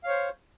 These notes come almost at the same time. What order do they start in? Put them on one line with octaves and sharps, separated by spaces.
F5 C#5 C5